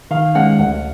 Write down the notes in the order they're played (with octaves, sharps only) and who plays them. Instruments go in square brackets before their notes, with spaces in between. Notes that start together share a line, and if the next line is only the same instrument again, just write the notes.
[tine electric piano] D#3 [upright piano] F5
[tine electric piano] G#3 C#4 [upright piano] F#5
[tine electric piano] D2 [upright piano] F#5